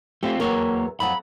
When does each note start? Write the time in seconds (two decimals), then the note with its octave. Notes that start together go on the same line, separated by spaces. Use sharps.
0.23 A3 C4 F4 G4
0.40 E2 F#3 A#3 A#4 C#5
1.00 F2 F#3 F#5 B5